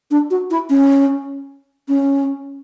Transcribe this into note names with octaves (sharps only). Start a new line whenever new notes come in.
D4
F#4
E4
C#4
C#4